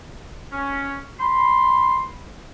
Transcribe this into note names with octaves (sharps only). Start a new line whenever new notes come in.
C#4
B5 C6